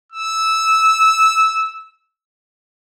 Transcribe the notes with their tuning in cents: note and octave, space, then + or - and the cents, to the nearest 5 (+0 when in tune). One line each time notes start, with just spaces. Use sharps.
E6 -10